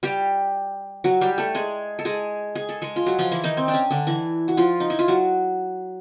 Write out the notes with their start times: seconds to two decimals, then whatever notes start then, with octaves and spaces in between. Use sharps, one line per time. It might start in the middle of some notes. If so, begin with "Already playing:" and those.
0.03 G3 G4
1.04 F#3 F#4
1.21 G3 G4
1.38 A3 A4
1.55 G#3 G#4
1.99 A4
2.05 G#3 G#4
2.55 G#4
2.69 A4
2.82 G#3 G#4
2.96 F4
3.06 F#3 F#4
3.19 F3 F4
3.31 E3 E4
3.43 D#3 D#4
3.57 C4
3.68 D4
3.74 C#4
3.90 D3 D4
4.07 E3 E4
4.48 F#4
4.57 F3 F4
4.80 D#4
4.90 E4
4.99 F4
5.08 F#3 F#4